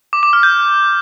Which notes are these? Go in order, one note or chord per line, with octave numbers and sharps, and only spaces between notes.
D6
D6
F6
G6